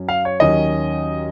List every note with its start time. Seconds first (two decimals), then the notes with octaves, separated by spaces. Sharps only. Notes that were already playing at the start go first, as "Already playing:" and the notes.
Already playing: F#2 F#3 C#4
0.09 F5
0.25 C#5
0.40 D#2 D#3 F#3 C#4 D#5